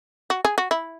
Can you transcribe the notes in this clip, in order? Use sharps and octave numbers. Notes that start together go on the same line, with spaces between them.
F#4
G#4
F#4
E4